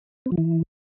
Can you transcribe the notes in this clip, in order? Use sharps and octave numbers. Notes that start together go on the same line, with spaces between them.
C4
F3
E3